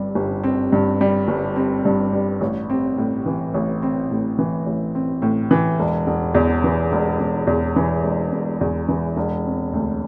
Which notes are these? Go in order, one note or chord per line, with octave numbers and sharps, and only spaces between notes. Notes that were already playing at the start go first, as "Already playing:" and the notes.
Already playing: G1 G2 G3 C4
G1
C4
G2
G3
G1
C4
G2
G3
A1
C4
A2
E3
A1
C4
A2
E3
A1
C4
A2
E3
E1
E1
E2
E3
E1
E1
E2
E3
E1
E1
E2
E3
E1
C4
D2